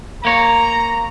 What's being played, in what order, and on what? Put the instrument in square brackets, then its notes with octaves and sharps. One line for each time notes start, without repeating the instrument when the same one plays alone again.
[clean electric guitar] A#3 C#5 [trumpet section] A#5